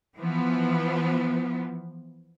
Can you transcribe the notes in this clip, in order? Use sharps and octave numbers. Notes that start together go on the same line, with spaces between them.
E3 F3 B3